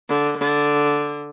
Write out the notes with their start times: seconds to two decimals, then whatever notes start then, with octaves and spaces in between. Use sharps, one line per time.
0.09 D3
0.37 D3